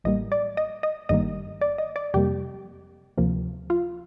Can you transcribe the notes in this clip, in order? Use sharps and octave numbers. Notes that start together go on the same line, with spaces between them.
A1 A2 G3 A#3 D#5
D5
D#5
D#5
G1 G2 D#3 G3 A#3 D#5
D5
D#5
D5
F2 C3 G3 A#3 G4
D2 C3 F3 A#3
F4